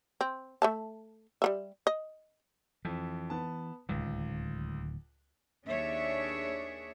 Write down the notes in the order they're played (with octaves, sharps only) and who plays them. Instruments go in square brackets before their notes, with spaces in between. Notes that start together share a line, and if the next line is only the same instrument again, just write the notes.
[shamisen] C4
A3 E5 A5
G3 A#3 E5
D#5
[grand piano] F2 [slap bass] E3
[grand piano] B3 A5
[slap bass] D1 D#3 [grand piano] C#2
[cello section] D#2 D4 G#4 C#5 E5